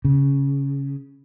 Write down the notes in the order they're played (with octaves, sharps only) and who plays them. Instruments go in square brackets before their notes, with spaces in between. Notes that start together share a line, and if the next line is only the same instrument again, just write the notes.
[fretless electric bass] C#3